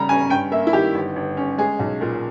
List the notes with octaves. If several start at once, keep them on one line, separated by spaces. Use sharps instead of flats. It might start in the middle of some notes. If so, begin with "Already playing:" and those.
Already playing: C#3 G3 A#5
C#4 G#5
G2 G5
A#3 E5
E4
D#3 G4
G1
G1
C#4
G#3 G#4
B1
A#2